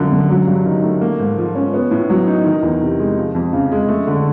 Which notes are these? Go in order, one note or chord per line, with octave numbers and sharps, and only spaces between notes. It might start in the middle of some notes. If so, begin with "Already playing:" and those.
Already playing: F#2 D3 F3
F#2
F#3
G2
D#3
A3
A#3
G#2
F3
C#4
B3
A2
F#3
D#4
D#3
E2
C3
G#3
F3
F2
C#3
G#3
A3
D3